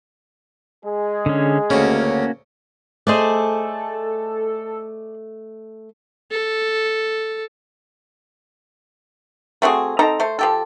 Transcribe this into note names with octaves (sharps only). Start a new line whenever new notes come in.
G#3 G#4
D3 C#4
D2 C#3 A#3 C#4 F#4
A3 G#4 A4 C5 D5 D#5
A4
A3 C4 F#4 G#4
C4 D#4 A4 A#5
A3 C5
F3 G4 A4